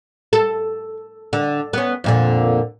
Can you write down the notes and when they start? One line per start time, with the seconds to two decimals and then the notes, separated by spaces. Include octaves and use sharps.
0.33 A4
1.33 D3
1.73 B3 C#4
2.04 F2 A#2 D3